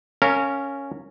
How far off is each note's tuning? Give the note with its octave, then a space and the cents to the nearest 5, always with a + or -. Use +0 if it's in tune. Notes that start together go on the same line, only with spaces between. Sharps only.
C#4 +0 A#4 -25 F5 +0